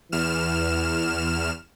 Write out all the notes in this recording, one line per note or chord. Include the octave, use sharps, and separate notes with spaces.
E2 E3 F6 E7